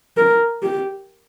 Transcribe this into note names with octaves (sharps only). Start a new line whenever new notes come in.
A#4
G4